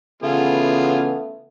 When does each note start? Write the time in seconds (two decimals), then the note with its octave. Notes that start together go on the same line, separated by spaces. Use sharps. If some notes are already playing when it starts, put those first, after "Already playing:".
0.23 C#3 E3 A3 B3 F4 G#4